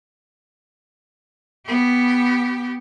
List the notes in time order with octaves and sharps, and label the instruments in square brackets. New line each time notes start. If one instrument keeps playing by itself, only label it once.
[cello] B3 G4